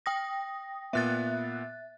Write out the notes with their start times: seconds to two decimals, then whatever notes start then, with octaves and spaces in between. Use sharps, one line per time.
0.06 G5 D#6 A#6
0.93 A#2 B3 E5 F#6 A6